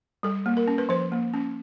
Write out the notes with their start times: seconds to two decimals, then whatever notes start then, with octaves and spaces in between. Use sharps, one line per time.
0.23 G3 A4
0.46 A#3
0.57 A#4
0.68 C#4
0.78 B4
0.89 F3 C5
1.12 A#3
1.34 C#4